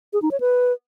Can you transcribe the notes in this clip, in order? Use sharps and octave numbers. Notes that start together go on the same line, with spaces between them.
G#4
D#4
C#5
B4